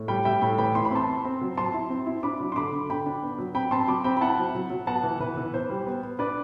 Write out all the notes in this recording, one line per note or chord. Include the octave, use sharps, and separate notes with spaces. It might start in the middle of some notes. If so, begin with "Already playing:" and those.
Already playing: A2
G3 G5 B5
G3 E5 G5
A2 G5 B5
E3 G5 B5
E3 C6
B5
C4 A5 C6
C4
C4
F#3
F#3 A5 C6
E4
C4
E4
D4 B5 D6
F#3
C6
D3 B5 D6
D3
D3 G5 B5
D4
B3
F#3
C4 G5 B5
C4 A5 C6
F#3 B5 D6
C4 G5 B5
B5
E4 F#5 A5
F#3
F#3
F#3
B3 F#5 A5
E3
E3 B4
E3
B3 C5
G3
B3
B3
D4 B4 D5